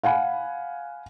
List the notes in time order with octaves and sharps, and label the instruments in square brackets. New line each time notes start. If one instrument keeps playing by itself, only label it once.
[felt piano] F5 F#5 G#5 B5